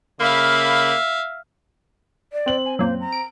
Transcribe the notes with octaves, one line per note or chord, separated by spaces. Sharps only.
C#3 A#3 E5 F5 B5
D5
C4 F#7
G#5
F#2 A#2 C5
A#5
D7